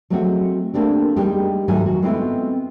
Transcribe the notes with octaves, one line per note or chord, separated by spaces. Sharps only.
F#3 G#3 A3 C4 C#4 F#4
A3 A#3 C4 D4 G4
G3 G#3 A#3 D#4 G4
G#2 D#3 F#3 A3 G#5
F#4
G#3 B3 C4 E4 F4 A4